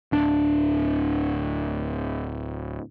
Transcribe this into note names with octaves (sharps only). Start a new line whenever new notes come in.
D1 D4